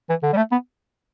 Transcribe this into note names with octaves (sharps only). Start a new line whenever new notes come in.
E3
D3
G3
A3
B3